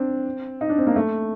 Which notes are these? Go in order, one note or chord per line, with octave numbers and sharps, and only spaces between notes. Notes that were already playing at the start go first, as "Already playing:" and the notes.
Already playing: C4 D4
D#4
D4
C4
A#3
A3